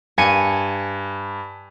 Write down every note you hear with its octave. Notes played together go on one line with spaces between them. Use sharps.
G2 G#5 C#7 D#7